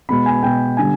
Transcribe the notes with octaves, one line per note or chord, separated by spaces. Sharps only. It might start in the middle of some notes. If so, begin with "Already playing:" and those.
B2 G#3 B3 B5
G#5
B2 G#3 B3 G5
D3 G3 B3 G#5